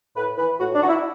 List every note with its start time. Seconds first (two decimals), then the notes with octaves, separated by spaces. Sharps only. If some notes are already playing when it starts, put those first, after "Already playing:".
0.16 A2 B4
0.38 E3 B4
0.60 A2 F#4
0.74 D4
0.81 E3 F#4
0.89 E4